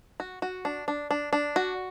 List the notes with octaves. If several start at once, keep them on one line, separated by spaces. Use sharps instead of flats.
F#4
F#4
D4
D4
D4
D4
F#4